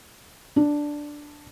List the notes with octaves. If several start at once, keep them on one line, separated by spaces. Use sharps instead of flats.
D4